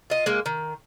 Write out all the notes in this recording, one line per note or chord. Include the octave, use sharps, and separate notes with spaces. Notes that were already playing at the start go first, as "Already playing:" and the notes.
F4 D#5
G#3 A#3
D#3